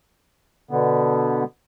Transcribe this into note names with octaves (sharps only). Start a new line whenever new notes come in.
B2 D3 B3